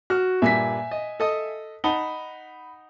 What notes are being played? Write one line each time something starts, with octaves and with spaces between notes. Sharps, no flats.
F#4 F6
G2 A#2 E5 G#5 B6
D#5
A4 D#5 D#6
D#4 F#5 A5 B5 G7